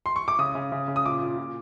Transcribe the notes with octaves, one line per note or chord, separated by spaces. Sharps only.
C6
C#6
D6
C#3 D#6
C#3
C#3
C#3
D#6
A#2 D6
A#2
A#2